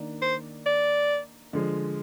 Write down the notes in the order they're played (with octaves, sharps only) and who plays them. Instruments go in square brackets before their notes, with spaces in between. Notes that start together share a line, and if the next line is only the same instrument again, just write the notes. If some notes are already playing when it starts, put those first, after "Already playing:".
Already playing: [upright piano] D#3 A#3 D4
[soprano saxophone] C5
D5
[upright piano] D3 F3 G#3